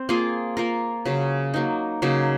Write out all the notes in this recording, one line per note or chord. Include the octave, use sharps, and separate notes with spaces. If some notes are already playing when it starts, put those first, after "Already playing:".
Already playing: C4
A#3 F4 G#4
A#3 F4 A#4
C#3 F#3 C#4
F#3 A#3 D#4
C#3 F#3 A#3 D#4